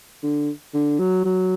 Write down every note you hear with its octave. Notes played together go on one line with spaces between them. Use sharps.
D3
D3
F#3
F#3